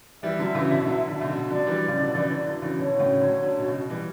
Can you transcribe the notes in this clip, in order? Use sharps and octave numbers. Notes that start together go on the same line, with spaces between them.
E3 G3 E5
D3 F#3
C#3 E3
B2 D3
D3 F#3
B2 D3
C#3
B2 D3
D3 F#3 D5
E3 G3
C#3
B2 D3
C#3 E3
D3 F#3
D3 F#3
C#3 E3
B2 D3 C#5
A2 C#3
D3 F#3
D3 F#3
B2
C#3
B2
E3 G3